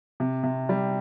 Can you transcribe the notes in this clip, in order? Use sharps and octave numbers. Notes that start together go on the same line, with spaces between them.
C3
C3
G3